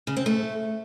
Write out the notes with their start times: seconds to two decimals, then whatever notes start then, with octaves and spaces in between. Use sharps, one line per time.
0.07 C#3
0.16 C4
0.26 A3